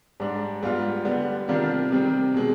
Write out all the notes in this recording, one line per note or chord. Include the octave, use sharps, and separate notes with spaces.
G#2 G3 D4
G#2 G3 B3 F4
D3 G3 B3
C3 D#3 G3 D4 F4
C3 D#3 G3 C4
B2 G#3 C4